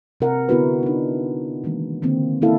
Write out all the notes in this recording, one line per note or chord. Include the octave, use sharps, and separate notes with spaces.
C3 C4 A#4 F#5
D3 B3 E4 F#4 B4
D4 D#4
D#3 E3 G#3 A#3
D3 D#3 A#3 C4
A#3 C#4 E4 A4 F5